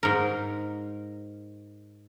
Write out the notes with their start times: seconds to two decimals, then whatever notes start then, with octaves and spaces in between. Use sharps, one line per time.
0.03 G#2 A#4